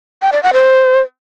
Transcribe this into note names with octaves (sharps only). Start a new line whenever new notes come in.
G5
D5
F#5
C5